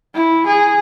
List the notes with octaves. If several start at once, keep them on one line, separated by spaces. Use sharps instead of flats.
E4
G#4